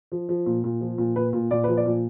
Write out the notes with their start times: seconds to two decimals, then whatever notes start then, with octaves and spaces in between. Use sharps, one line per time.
0.12 F3
0.29 F3
0.46 A#2
0.64 A#2
0.81 F3
0.98 A#2
1.16 A#2 B4
1.33 A#2
1.51 A#2 D5
1.64 F3 B4
1.77 D5
1.86 A#2